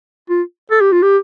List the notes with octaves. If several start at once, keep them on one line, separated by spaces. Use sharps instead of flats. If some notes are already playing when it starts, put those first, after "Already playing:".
F4
A4
G4
F4
G4